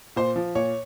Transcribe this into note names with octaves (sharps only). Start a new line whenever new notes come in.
A#2 C5
F3
A#2 C#5